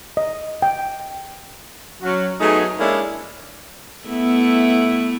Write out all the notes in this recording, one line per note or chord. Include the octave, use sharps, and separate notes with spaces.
D#5
G5
F#3 C#4 F#4
F#3 A3 B3 D#4 G#4
G#3 A#3 C#4 D4 E4 A4
A3 B3 E4